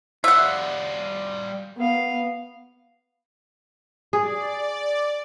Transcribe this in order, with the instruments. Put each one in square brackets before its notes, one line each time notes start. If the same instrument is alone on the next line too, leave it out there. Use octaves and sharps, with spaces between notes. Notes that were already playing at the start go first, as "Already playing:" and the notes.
[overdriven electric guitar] G3 F4 [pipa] E5 F#5
[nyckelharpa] B3 F5
[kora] G#4 [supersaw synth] D5